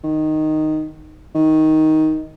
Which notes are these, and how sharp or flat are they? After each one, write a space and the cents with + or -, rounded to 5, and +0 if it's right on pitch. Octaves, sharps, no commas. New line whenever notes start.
D#3 -5
D#3 +10